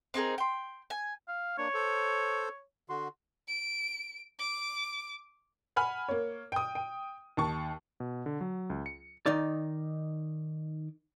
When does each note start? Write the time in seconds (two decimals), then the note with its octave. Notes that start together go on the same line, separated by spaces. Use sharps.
0.14 C4 D#4 G#4 A#4
0.38 G5 C6
0.90 G#5
1.28 F5
1.58 A#3 D4 C#5
1.74 A4 C5
2.89 D3 F#4 C6
3.48 D7
4.39 D6
5.76 F#5 G#5 B5 F6
6.09 A#3 C#5
6.52 G5 D#6
6.75 G5
7.37 D#2 A5 C#6
8.00 B2
8.26 D3
8.41 F#3
8.70 C#2
8.86 C#7
9.26 D#3 D#4 D5